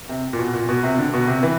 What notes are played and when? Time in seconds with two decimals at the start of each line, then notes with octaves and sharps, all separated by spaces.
0.09 C3
0.33 A#2
0.39 B2
0.54 A#2
0.69 B2
0.83 C3
0.98 D3
1.13 B2
1.27 C3
1.43 E3